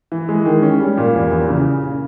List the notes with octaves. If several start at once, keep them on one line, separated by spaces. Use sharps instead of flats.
E3
G#3
D#3
C#4
G3
A#2
E2
E2
C#3